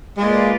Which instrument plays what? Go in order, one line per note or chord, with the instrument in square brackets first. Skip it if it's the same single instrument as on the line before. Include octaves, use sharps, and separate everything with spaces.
[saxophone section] G#3 [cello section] A#3 F4 B4 D5